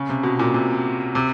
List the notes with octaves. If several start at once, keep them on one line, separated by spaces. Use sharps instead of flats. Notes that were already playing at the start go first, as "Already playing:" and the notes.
Already playing: C#3
C3
B2
A#2
C3
C3